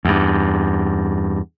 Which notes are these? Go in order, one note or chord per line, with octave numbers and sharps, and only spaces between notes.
E2 G2